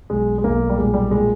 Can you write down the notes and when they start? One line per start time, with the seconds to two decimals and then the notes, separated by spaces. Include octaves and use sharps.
0.10 B1 G#3
0.38 G#3
0.44 B1 A#3
0.69 G3
0.77 A#2 G#3
0.94 G3
1.11 A#2 G#3